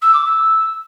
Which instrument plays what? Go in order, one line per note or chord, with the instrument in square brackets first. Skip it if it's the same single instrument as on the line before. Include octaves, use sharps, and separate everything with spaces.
[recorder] E6
D6
E6